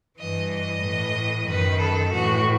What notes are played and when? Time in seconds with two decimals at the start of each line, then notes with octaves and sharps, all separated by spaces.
0.18 G2 E3 D#5
0.51 D#5
0.83 A2 E3
1.47 F#2 D#3 B4
1.79 A4
2.12 A2 E3 F#4